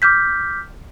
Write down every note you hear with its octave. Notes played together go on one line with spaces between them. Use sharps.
D6 F6 G6 B6